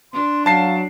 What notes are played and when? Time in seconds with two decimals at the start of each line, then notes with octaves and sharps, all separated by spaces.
0.13 D4 C6
0.46 F#3 F5 A5 C7